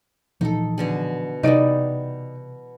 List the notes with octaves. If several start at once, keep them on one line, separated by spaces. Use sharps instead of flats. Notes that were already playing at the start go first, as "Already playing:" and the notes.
A#2 E3 F3 D#4 A4
B2 D3 G#4
C3 E3 G3 B3 D#4 D5